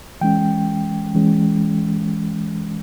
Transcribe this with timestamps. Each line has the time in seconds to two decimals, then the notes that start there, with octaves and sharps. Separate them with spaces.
0.21 E3 G#3 C#4 G5
1.15 E3 G#3 C#4